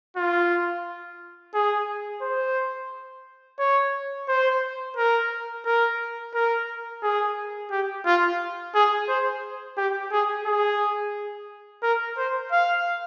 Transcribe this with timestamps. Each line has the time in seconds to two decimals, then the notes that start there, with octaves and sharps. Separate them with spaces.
0.17 F4
1.54 G#4
2.22 C5
3.59 C#5
4.29 C5
4.97 A#4
5.66 A#4
6.34 A#4
7.03 G#4
7.71 G4
8.06 F4
8.74 G#4
9.09 C5
9.77 G4
10.12 G#4
10.46 G#4
11.83 A#4
12.17 C5
12.52 F5